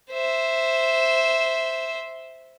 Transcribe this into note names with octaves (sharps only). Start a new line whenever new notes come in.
C5 E5